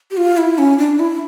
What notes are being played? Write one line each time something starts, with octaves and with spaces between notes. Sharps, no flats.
G4
F4
E4
C#4
D4
E4